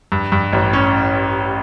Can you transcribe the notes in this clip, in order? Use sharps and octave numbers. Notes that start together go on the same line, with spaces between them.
G2
G2
A1
C#4